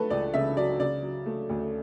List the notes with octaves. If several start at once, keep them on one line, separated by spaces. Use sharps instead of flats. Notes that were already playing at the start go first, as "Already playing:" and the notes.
Already playing: F#3 A3 F#4 A4 B4
C#2 D5
C#3 E5
F#3 D5
C#3 D5
F#3
A3
D2